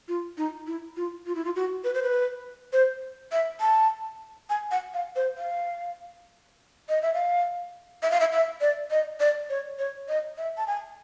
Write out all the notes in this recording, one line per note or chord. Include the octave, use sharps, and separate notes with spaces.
F4
D#4
E4
F4
F4
E4
F4
F#4
B4
C5
B4
C5
E5
A5
G#5
F#5
F5
C5
F5
D#5
E5
F5
E5
F5
E5
E5
D5
D#5
D5
C#5
C#5
D#5
E5
A5
G#5